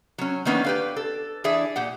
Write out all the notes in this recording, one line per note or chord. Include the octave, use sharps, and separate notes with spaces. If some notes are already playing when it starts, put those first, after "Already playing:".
F#3 C#4
D#3 E3 A#3 B3 C#4 D4
G4 B4 F5
A4
E3 D4 G#4 E5
A#2 G4 F#5